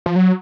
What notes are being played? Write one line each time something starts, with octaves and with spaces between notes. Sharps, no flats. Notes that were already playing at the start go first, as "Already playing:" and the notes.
F3
F#3